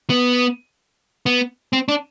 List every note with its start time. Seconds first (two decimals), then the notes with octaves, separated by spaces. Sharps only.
0.10 B3
1.26 B3
1.73 C4
1.88 D4